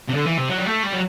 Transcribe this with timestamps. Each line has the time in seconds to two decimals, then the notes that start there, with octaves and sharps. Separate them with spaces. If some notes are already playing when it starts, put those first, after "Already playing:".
0.09 C3
0.15 D3
0.26 E3
0.38 C3
0.49 F#3
0.58 G3
0.66 A3
0.83 G3
0.93 F#3